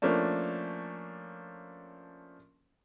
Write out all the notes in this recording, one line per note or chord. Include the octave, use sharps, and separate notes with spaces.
F3 A3 A#3 C#4 D4